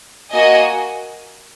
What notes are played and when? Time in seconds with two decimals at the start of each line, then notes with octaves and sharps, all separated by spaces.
0.33 A#3 F#4 D#5 G#5